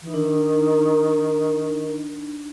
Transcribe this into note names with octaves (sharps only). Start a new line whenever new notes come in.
E3 D#4
D#3 D4